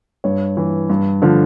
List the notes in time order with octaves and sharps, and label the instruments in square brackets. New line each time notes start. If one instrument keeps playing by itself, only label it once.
[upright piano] G2 C#5
E3
G2
D3 F3